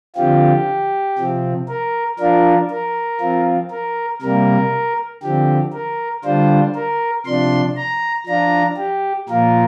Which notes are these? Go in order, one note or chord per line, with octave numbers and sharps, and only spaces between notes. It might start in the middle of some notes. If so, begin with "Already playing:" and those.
D3 F3 C4 F4 G4
C3 F3 C4
A#4
F3 D4 F4 A#4
A#4
F3 C4 F4
A#4
C3 G3 A#3 A#4
D3 F3 C4 G4
A#4
D3 G3 D4 F4 C5
A#4
C3 F3 D4 C6
A#5
F3 D4 F4 A#5
G4
A#2 F3 A#3 F4 A#4